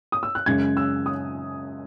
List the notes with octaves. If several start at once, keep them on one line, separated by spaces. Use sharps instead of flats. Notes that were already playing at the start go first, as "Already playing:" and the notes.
D#6
E6
F#6
F#2 C#3 G#3 G#6
E6
D#6